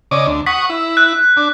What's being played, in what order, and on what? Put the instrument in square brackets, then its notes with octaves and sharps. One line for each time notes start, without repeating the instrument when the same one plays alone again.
[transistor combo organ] C#3 D5 D#5
D2
[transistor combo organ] F#5 C#6 D#6 [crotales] B6
[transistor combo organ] E4
[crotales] F#6
[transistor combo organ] D4